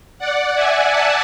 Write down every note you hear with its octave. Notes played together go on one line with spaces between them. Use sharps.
D5 F#5
E5 G#5
F#5 A5